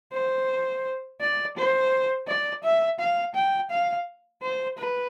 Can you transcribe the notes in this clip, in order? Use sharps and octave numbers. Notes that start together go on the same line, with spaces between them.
C5
D5
C5
D5
E5
F5
G5
F5
C5
B4